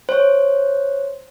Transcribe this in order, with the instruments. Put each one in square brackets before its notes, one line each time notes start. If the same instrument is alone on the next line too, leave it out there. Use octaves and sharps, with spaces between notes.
[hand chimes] C5 C#5